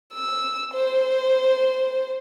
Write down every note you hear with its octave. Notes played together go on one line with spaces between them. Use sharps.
E6
C5